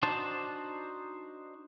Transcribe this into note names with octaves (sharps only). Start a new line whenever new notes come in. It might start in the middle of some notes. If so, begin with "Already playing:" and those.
D4 D#4 F#4 C5 A5